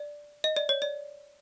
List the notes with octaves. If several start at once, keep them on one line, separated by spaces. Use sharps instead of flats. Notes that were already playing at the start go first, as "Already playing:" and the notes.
Already playing: D5
D#5
D5
C#5
D5